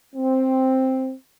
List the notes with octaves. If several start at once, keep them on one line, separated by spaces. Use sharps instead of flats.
C4